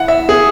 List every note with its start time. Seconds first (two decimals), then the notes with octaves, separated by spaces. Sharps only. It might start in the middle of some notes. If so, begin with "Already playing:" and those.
Already playing: E4 F#5
0.08 E5
0.29 G#4